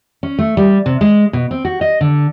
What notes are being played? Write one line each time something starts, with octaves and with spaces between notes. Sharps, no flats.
C#4
A3
G3
C3
G#3
B2
C4
F#4
D#5
D3